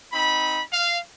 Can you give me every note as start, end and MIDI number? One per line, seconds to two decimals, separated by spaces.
0.12 0.62 60
0.12 0.62 63
0.12 0.62 83
0.73 0.98 77